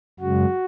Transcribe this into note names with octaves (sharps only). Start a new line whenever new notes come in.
F#2 C#3 G#3 F#4